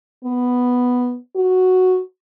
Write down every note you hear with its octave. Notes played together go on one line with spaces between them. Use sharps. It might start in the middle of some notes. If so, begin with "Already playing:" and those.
B3
F#4